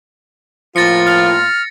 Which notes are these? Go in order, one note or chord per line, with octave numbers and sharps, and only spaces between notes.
A2 F3 A#3 F4 A6 A#6 C#7
F6